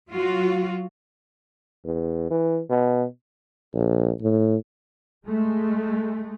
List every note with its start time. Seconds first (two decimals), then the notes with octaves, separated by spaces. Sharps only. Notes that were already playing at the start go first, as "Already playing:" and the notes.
0.10 F#3 F4 F#4
1.85 E2
2.30 E3
2.70 B2
3.74 A#1
4.21 A2
5.26 G#3 A3